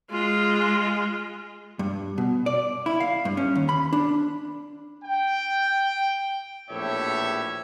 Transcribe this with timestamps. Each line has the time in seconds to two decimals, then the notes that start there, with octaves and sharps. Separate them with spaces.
0.11 G#3 F4
1.79 G2
2.18 B2
2.46 D5
2.86 E4
3.00 F5
3.25 G2
3.37 C#4
3.55 D#2
3.69 B5
3.93 D4
5.04 G5
6.70 A#1 E2 A2 G4 C#5 E5